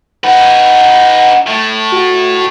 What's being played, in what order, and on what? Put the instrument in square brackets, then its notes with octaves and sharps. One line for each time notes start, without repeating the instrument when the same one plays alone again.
[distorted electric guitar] D#4 B4 [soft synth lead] F#5
[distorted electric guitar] A2 A3
[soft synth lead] F#4